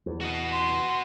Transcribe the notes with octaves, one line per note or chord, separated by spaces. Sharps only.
E2
F#4 D#5
C6